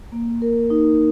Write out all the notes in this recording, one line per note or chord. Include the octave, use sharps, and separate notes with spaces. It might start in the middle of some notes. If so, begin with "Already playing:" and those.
A#3
A#4
D#4